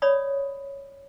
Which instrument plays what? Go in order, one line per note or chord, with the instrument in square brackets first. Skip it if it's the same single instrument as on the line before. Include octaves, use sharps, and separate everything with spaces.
[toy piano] C#5 D5 B5 D#6